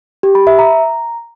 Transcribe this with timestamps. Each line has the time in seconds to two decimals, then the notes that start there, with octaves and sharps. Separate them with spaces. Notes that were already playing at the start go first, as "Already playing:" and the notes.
0.23 G4
0.35 B5
0.47 E5
0.59 A#5